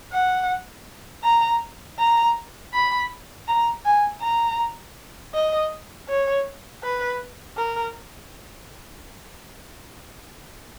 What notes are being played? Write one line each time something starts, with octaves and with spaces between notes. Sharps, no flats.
F#5
A#5
A#5
B5
A#5
G#5
A#5
D#5
C#5
B4
A#4